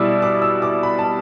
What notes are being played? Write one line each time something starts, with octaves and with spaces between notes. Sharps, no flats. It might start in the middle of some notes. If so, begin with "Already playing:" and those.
Already playing: B2 G3 E4 D5 E6
D6
E6
D6
B5
A5